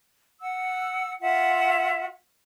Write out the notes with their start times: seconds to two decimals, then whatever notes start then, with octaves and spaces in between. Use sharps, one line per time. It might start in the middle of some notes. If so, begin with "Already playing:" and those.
0.40 F#5 E6
1.21 F4 E5 F#5